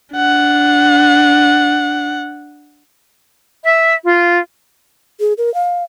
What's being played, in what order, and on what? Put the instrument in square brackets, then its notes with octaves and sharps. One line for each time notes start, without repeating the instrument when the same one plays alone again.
[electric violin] D4 F#5
[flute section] E5
F4
[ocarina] G#4
A#4
F5